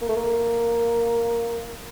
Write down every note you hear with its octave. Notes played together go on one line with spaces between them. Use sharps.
A#3
A3
A#3